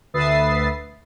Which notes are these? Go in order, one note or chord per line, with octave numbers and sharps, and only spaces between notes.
D2 B4 E5 D#6 A6 C7